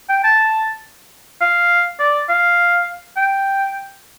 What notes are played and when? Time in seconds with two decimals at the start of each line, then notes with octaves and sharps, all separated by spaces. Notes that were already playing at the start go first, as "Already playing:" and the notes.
0.09 G5
0.24 A5
1.41 F5
2.00 D5
2.29 F5
3.17 G5